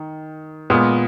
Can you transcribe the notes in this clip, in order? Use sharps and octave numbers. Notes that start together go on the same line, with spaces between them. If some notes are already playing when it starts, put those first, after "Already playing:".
Already playing: D#3
A#2 G#3 B3